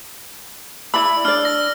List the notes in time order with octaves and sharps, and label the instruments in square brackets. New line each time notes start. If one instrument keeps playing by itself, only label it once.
[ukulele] E4 D5 B5 [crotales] E6
[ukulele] D4 D5 [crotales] F6
[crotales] A#6